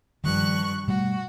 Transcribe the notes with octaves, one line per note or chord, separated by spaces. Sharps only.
G2 D#3 F3 C#6 F#6
B2 G3 A3 F#4